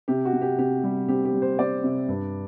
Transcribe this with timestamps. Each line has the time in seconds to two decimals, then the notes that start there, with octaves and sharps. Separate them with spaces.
0.08 C3 G4
0.25 F#4
0.33 C3
0.41 G4
0.58 C3 G4
0.83 G3
1.08 C4 G4
1.25 G4
1.33 G3
1.42 C5
1.59 C4 D5
1.84 C3
2.09 G2